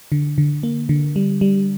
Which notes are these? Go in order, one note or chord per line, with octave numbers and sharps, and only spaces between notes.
D3
D3
A#3
D3
G3
G3